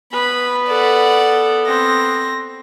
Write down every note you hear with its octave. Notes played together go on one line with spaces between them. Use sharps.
B3 B4 B5
A4 D5 F#5
C4 A#6